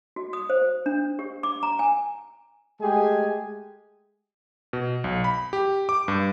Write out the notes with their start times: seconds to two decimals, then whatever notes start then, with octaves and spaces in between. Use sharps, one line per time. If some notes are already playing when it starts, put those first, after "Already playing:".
0.16 F#4
0.33 D#6
0.50 C5
0.86 D4
1.19 G4
1.43 D6
1.63 A#5
1.79 G#5
2.81 G#3 A3 G4 G#4 G#5
4.73 B2
5.04 B1
5.24 B5
5.53 G4
5.89 D6
6.08 G2